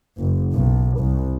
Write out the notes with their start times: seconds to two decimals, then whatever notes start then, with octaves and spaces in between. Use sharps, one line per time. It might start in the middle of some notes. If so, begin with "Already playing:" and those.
0.18 F#1
0.52 B1
0.99 C2